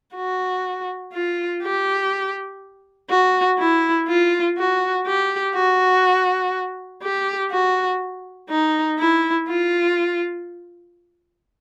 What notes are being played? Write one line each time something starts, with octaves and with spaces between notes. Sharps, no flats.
F#4
F4
G4
F#4
E4
F4
F#4
G4
F#4
G4
F#4
D#4
E4
F4